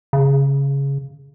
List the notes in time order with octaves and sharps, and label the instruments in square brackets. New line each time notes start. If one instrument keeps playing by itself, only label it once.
[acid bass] C#3